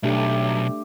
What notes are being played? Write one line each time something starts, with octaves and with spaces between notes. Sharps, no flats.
B1 A3 D4 G4